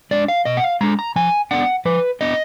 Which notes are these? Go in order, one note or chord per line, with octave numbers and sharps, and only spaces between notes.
G#3 D4 D5
F5
B2 D#5
F#5
F5
G#3 D4 A#5
A#5
F3 G#5
B3 D4 F#5
F3 B4
B3 D4 D#5